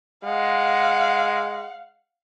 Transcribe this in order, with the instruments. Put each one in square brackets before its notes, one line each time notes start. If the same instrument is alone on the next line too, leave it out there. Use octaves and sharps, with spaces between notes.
[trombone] G#3 [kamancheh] F5 F#5